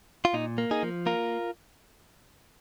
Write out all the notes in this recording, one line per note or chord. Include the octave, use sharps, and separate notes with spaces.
F4
A#2 D#4
A#3
D#4 G#4
F3
A#3 F4 A#4